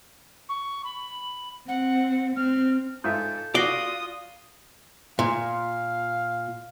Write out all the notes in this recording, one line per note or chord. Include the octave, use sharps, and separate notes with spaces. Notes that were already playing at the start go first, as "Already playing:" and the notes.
C#6
B5
C4 F#5
C4 F6
G#2 F4 A4 E5 G6
F4 F#4 D5 D#6 A#6 C7 G7
A#2 F5